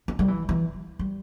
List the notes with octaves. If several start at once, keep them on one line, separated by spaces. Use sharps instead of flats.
C#4
G3
E3
E3
G3